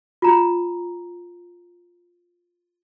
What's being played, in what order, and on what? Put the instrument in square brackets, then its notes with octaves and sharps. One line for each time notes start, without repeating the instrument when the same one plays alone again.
[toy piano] F4 A#5